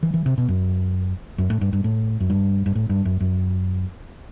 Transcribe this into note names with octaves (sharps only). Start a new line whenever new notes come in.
E3
E3
C3
B2
F#2
F#2
A2
G2
G2
A2
F#2
G2
G2
A2
G2
F#2
F#2